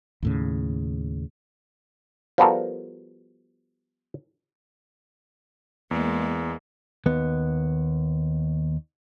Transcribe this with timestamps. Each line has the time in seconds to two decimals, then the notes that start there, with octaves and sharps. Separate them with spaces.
0.23 D#2 A2 C#3
2.38 F3 G3 B3 F#4 A4 A#4
5.91 E2 G#3 A#3
7.06 D#2 B3